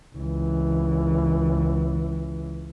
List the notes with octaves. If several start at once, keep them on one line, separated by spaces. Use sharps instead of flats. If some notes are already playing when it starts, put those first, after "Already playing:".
C#2 E3